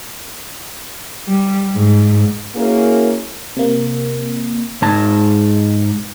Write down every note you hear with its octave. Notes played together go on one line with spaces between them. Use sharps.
G3
G#2
A#3 C#4 E4 F#4 G#4 A#4
C3 A#3
G#2 A5